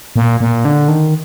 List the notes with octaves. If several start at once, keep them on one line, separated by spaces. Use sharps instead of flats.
A#2
A#2
D3
D#3